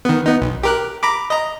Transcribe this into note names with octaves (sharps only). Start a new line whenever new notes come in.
D#3 B3
B3 D#4
B1
G4 A#4 F#6
A#5 B5 D6
D#5 A#5